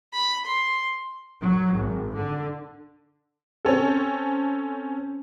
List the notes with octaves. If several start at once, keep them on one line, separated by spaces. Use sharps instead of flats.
B5
C6
F#3
G#1
D3
C4 C#4 A4